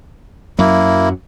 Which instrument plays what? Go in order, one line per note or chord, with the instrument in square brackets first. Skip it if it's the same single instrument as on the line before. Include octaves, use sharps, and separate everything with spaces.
[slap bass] F#2 F#3 [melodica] A#3 E4